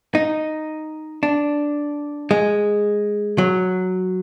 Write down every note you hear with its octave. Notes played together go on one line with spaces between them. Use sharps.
D#4
D4
G#3
F#3